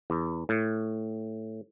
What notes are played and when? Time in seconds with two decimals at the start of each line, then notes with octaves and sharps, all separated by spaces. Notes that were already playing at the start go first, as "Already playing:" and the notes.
0.10 E2
0.49 A2